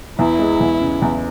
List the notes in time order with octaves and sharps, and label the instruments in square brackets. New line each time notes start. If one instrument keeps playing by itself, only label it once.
[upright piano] E2 [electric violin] E4
[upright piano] G#3
E2
C#3
E2